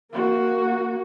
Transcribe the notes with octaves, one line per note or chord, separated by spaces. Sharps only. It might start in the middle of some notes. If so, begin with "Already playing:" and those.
A#3 F#4